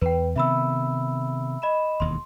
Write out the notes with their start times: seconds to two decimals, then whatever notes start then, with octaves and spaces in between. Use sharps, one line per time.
0.01 E2 B4 G5
0.36 C3 D#3 B3 E5 B5 E6
1.62 D#5 B5 E7
2.00 E1 D#2 C6